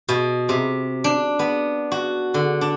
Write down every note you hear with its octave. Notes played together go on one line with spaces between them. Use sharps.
B2
C3
D4
B3
F#4
D3
D4